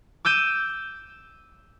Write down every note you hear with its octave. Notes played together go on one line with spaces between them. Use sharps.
D6 E6 G6 D#7